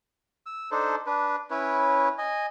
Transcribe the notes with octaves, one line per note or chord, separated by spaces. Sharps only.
E6
D4 D#4 A4 C5
D4 B4
C#4 E4 B4 C#5
D#5 G#5